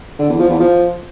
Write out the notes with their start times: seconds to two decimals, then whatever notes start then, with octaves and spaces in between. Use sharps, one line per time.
0.19 D3
0.29 E2
0.39 F3
0.50 E2
0.60 F3